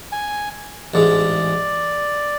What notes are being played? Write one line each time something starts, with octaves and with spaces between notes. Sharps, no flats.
G#5
A1 G#2 G#3 D5